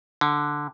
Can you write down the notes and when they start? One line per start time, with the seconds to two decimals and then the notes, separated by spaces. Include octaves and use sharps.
0.21 D3